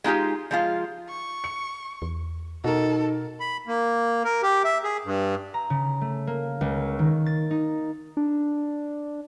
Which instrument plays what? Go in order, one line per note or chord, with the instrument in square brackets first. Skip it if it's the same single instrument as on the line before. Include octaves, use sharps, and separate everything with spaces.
[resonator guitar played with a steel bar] G#3 D#4 F4 G4
F3 G#3 F4
[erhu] C#6
[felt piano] C#7
[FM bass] E2
[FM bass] B2 [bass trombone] D#4 [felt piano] F#4 A#4 [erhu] A4
[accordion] B5
A#3
A#4
G4
E5
G#4
G2
[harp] A#5
C#3
A3
A#3
C#2
D#3
A6
D#4
[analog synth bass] D4